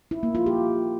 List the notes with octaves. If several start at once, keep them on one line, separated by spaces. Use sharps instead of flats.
E4
A#3
F4
G4